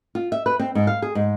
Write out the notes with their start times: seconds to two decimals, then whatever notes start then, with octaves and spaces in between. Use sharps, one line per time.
0.15 F4
0.32 E5
0.46 B4
0.59 C4
0.75 G#2
0.87 F5
1.02 G#4
1.15 G#2